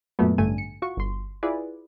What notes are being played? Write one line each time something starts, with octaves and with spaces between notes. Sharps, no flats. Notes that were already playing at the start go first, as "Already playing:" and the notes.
F#2 A#2 F#3 A3 B3
A1 G2 D3 A3 G#5 D#7
C#7
F4 F#4 C#6
G1 C6
E4 F4 G#4 B4 D5